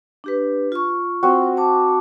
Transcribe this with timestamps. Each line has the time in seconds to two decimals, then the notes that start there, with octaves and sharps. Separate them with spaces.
0.24 D4 G4 B4
0.72 F4 C#6
1.23 C4 F#4
1.57 A5 D6